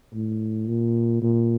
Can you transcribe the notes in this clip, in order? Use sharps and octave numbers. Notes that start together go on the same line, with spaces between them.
A2
A#2
A#2